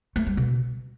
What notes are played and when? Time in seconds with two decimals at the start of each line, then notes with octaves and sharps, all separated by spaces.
0.16 A3
0.27 G3
0.37 B2